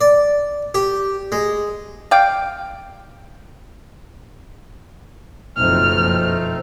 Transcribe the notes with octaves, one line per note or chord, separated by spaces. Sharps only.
D5
G4
G#3
D5 F5 G5
F#1 B1 F2 A3 C4 D#4 F6